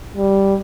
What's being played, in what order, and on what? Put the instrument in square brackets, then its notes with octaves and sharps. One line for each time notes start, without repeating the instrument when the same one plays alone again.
[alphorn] G3